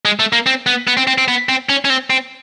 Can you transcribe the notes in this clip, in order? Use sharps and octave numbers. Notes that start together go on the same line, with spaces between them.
G#3
A3
A#3
C4
B3
B3
C4
C4
C4
B3
C4
C#4
C#4
C4
C4